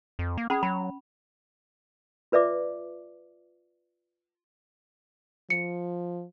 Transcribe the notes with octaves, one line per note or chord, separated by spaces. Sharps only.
F2
A#3
C#4 G#4 B5
F#3 B5
F4 B4 D5 E5 D6
F3 C#7